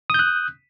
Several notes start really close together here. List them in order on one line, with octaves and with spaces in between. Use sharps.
D#6 G6 F#6